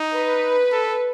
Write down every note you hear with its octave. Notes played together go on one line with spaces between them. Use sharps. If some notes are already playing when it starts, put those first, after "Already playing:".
Already playing: D#4
B4
A4